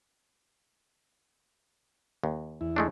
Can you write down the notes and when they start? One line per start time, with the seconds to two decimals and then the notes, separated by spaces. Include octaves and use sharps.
2.24 D#2
2.61 E2 E4
2.76 G#3 A3 D4